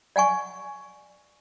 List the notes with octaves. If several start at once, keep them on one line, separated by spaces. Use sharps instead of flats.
D5 F#5 G#5 C#6